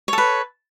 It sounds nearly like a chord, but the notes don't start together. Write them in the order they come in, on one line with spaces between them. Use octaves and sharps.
C#5 A4 B4